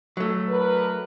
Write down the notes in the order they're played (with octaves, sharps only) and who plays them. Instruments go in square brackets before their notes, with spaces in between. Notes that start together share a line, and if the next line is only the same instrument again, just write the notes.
[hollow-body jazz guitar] F#3 A3
[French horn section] D3 A#4 B4